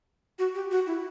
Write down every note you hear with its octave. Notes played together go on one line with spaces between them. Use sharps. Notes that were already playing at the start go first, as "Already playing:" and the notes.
F#4
G4
F#4
E4